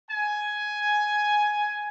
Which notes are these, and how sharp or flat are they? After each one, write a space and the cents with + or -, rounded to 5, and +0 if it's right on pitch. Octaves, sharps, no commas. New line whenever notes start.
G#5 +10